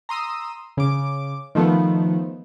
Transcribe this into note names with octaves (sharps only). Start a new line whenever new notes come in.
A#5 C6 D#6 E6
C#3 D6
D#3 F3 A3 B3